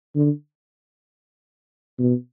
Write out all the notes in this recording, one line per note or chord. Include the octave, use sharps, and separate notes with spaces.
D3
B2